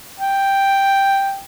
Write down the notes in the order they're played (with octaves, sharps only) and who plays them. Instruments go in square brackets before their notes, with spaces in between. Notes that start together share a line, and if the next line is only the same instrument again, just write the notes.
[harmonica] G5